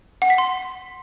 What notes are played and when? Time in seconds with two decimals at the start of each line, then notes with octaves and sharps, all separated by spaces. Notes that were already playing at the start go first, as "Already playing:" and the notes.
0.22 F#5
0.30 B6
0.38 C6